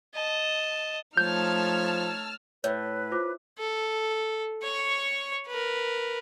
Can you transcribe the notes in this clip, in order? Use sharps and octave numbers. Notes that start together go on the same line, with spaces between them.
D#5 A5
F3 A3 D#4 C#5 A5 E6 F6 G6
A2 B4 C#5
F4 C5 D6
A4
C#5 C#6
A#4 B4